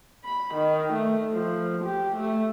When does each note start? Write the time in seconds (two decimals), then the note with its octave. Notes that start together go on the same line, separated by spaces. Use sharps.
0.25 B5
0.55 D#3
0.93 A3
1.33 F3
1.84 G4
2.17 A3